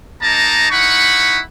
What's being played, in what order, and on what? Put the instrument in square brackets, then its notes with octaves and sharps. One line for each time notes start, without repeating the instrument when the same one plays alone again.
[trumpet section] A#3 D#4 D#5 A5 A#5
D#4 E4 F#5 B5 C#6